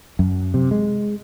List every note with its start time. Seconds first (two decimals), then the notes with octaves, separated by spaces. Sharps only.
0.19 F#2
0.54 C3
0.71 G#3